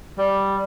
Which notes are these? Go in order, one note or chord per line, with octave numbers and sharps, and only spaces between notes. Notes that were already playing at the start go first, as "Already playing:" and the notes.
G3